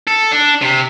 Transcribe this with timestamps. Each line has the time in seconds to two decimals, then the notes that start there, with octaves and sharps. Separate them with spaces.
0.07 A4
0.31 D4
0.61 C3